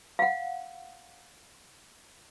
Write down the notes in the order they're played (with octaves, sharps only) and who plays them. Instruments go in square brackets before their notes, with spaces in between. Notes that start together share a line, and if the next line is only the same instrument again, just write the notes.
[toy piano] F5 F#5